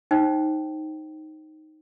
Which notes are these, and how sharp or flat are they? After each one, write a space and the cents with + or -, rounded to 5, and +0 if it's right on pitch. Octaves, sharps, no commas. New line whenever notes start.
D#4 +0 C5 +30 G5 -10